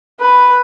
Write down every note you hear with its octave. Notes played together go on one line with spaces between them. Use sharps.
B4